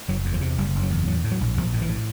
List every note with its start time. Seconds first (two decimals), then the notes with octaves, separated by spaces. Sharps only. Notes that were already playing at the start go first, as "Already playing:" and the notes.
0.08 F#1 F#3
0.25 E2
0.34 F3
0.41 C3
0.58 F#1 G3
0.75 F#1
0.83 F#3
0.90 E2
1.07 A2 F#3
1.24 A2
1.31 F#3
1.41 A#1
1.57 A#1 F3
1.74 A2
1.82 E3
1.89 A2